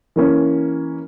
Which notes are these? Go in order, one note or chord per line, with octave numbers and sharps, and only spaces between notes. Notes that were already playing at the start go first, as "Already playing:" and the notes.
E3 A#3 C#4